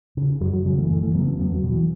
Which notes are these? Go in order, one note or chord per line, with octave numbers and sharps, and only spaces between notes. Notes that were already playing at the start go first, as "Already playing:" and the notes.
C#3
F#2 F#3
F#3
C#3 F#3
E3 A3
F#2 E3 A3
E3 A3
C#3 F#3 B3
A3 C#4
E2 F#3 B3
A3
F#3
B2
E3